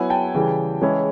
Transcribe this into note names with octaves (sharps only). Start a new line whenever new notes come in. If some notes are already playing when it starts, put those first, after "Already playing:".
Already playing: F#3 B3 E4 F#5 G#5
G5 A5
C#3 E3 G3
E3 G#3 C#4 E4